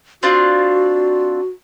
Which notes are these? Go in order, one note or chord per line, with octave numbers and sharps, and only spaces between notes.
C4 D4 F4 F#4